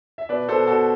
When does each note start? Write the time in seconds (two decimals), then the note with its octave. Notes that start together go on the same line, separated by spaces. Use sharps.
0.18 E5
0.29 B2 B4 D5
0.49 B2 A4 C5
0.67 B2 F#4 A4